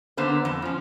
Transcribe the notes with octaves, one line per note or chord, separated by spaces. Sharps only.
D3 A#3 B3 C5
F2
F3 C#4